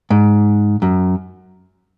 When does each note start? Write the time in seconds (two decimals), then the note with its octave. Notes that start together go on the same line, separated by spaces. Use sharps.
0.10 G#2
0.82 F#2